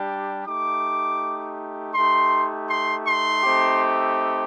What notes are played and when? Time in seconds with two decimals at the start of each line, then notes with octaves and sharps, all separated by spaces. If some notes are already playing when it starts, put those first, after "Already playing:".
Already playing: G3 D4 G4
0.47 A3 D#4 G4 D6
1.94 A3 D#4 G4 C6
2.69 C6
3.07 C6
3.43 A3 C4 D#4 G4